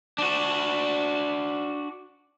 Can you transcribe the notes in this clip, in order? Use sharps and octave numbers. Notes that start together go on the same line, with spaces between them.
D4 F#4